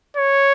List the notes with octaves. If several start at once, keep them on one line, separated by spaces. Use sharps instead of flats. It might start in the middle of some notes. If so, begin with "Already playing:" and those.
C#5